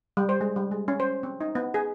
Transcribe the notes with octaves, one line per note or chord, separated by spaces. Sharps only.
G3
C5
G#3
G3
G#3
C#4
C5
C4
D#4
B3
G#4